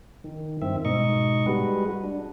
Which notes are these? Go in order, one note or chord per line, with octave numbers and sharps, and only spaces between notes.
D#3
G2 D#3 C4 E5
G#2 B2 D#4 D#5 C#6
G3 G#3 F#4 B4
D4